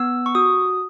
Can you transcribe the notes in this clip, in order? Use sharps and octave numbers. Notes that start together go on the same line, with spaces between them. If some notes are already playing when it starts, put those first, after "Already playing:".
Already playing: B3 E6
C#6
F#4 D#6